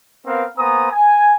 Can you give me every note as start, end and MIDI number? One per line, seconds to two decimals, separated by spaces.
0.26 0.45 59
0.26 0.45 60
0.26 0.45 70
0.26 0.45 77
0.58 0.87 58
0.58 0.87 59
0.58 0.87 72
0.58 0.87 80
0.58 0.87 82
0.58 0.87 87
0.91 1.33 80